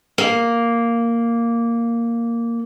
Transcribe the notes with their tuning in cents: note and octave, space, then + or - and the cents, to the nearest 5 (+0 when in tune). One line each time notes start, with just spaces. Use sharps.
A#3 -5